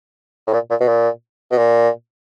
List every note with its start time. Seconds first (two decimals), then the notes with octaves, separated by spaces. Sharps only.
0.47 A2
0.53 A#2
0.70 A#2
0.80 B2
0.88 A#2
1.51 B2
1.58 A#2